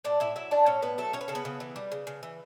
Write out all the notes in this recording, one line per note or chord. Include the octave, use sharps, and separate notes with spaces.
A2 D4 D5
A2 E4 E5
F#3 E4 E5
C#4 D4 D5
A2 C#4 C#5
A2 B3 B4
F#3 A3 A4
C#4 C#5
B4
C#3 A4
B3 B4
C#3
E3
G3
C#3
C#3
E3